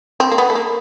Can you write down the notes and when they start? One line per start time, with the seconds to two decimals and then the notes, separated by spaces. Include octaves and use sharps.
0.20 C4
0.32 A#3
0.38 B3
0.50 A3
0.55 A#3